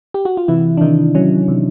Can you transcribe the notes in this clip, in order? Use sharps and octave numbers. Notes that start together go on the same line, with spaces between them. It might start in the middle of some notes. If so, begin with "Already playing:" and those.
G4
F#4
F4
C3 E3 E4
D4
C3 D#3 D#4
F#3 C#4
C3